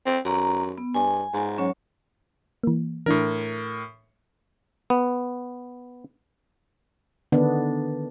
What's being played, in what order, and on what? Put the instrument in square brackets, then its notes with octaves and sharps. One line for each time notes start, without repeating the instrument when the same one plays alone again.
[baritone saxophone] C4
[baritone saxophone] F#2 [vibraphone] A#5
[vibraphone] B3
[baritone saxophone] G2 [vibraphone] G#5
[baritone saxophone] G#2
[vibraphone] F#3 C#4 C#5
[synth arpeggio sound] E3 A#3
[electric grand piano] A2 A#4 [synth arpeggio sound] E3 D4 E4
[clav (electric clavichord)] B3
[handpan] D3 D#3 B3 D4